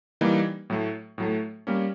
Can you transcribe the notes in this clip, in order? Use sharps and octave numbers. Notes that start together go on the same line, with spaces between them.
E3 G3 A#3 D#4
A2 F#3 A3
A2 F#3 A3
G3 A#3 C#4